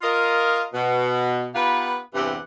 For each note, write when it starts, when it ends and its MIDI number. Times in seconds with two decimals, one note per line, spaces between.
0.02 0.65 65
0.02 0.65 70
0.02 0.65 75
0.74 1.49 47
1.55 1.98 59
1.55 1.98 63
1.55 1.98 65
1.55 1.98 67
1.55 1.98 71
2.14 2.38 40
2.14 2.38 43
2.14 2.38 48
2.14 2.38 52
2.14 2.38 67
2.14 2.38 78